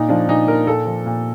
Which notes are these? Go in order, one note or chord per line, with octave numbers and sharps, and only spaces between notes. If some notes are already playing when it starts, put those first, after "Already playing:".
Already playing: A#2 D#4
F3 D4
A#2 D#4
F3 A#4
A#2 A4
F3
A#2